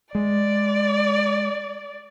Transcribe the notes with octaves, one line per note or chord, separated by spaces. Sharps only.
G#3 D5